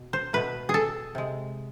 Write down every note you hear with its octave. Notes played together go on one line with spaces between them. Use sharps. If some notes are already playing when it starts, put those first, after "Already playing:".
Already playing: B2
C5
B2 A3 B4
G#4
A4
C3 G#3